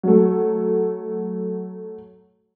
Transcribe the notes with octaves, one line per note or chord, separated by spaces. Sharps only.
F#3 A3